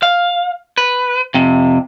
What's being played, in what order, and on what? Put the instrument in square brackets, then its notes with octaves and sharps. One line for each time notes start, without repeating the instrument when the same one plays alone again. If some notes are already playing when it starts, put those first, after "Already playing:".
[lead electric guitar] F5
B4
F2 C3